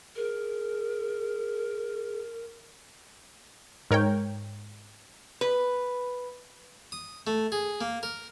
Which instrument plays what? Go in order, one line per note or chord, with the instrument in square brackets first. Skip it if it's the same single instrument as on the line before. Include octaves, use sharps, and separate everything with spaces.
[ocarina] G#4 [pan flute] A#4
[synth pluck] G#2 A#4 C#5 G5
[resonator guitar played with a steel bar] B4
[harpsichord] D#6
A3
G#4
A#3
A#4